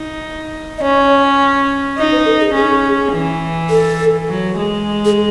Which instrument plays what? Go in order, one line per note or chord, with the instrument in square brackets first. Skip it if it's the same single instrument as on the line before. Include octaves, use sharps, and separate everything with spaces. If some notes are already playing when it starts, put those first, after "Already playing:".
Already playing: [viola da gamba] D#4
[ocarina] D#5
[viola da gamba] C#4 [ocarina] C#5
[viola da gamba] D#4 [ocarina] D#5
[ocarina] B4
A4
G#4
[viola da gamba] C#4 [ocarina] G#4
[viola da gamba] E3
[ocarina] A4
[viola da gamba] F#3
G#3
[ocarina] G#4